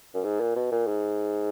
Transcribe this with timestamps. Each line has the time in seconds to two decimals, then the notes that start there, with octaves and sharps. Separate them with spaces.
0.14 F#2
0.24 G#2
0.40 A#2
0.56 B2
0.71 A#2
0.87 G#2